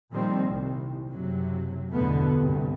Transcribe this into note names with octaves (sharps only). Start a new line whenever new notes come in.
A#2 D#3 F3 G3 C4
C2
F#1 C3 F#3
G1 E2 B2 D3 A3 B3
C2 G2